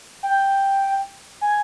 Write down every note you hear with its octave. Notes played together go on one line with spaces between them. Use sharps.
G5
G#5